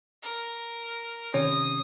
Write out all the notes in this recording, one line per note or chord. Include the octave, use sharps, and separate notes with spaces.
A#4
C3 D#3 C#4 C#5 D#6